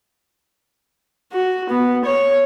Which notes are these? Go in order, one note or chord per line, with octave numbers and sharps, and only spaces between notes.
F#4
B3
C#5